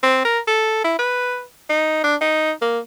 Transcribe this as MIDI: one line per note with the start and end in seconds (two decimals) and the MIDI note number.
0.03 0.23 60
0.25 0.39 70
0.47 0.80 69
0.84 0.95 64
0.99 1.43 71
1.70 2.01 63
2.04 2.15 62
2.21 2.51 63
2.61 2.79 58